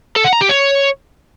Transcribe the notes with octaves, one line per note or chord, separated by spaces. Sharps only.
A4
F#5
A#5
G4
C#5